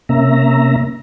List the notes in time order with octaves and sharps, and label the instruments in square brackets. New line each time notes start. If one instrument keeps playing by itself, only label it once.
[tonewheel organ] C3 A#3 C#4 E5 A#5